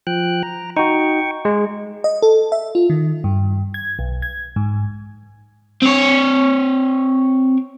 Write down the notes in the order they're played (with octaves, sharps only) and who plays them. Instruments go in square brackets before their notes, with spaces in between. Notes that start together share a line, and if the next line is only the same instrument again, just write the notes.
[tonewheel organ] F3 G5 F#6
A#5
[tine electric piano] D#4 F#4 [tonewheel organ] G5 C#6
[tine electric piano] G#3
[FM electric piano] D#5
A4
E5
F4
D#3
G2
G#6
B1
G#6
G#2
[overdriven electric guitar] C4 C#5